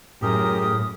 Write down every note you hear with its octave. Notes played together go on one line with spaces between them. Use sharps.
F#2 A2 G4 G#4 A#4 D#6